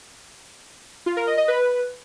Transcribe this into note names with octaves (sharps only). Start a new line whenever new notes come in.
F4
A#4
D#5
D#5
B4